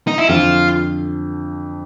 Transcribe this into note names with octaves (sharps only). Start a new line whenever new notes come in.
D#4
E4
F2 D3 F3 F4